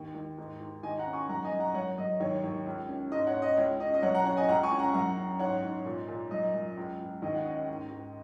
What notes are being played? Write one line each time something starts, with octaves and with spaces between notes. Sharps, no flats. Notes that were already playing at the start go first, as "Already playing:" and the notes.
Already playing: D#2
D#2
G#2
G#2
D#2 D#5 G#5
F#5 A#5
C#4
G#5 C#6
F#2 F#5 A#5
D#5 G#5
F#2
F#5 A#5
F#2 C#5 F#5
F#2 D#5
D#2 C#5
D#2
C#2
C#4
G#2 D#5
C#5 F#5
C#4
D#5
C#2 C#5
C#4 D#5
D#5
F#2 C#5 F#5
F#5 A#5
C#4 C#5 F#5
D#5 G#5
C#2 F#5 A#5
G#5 C#6
C#4
F#5 A#5
F#2 F#5 A#5
C#4
G#2 C#5 F#5
G#2
A#2
A#2
F#2 D#5
F#2
C#2
C#2
D#2 D#5
F#5
C#4 D#5
G#2
G#2